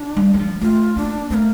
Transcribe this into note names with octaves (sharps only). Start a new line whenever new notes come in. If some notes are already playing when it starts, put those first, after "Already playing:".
Already playing: D4
G3
G3
F3
A3 F4
A#3 D4
A3 A#3 C4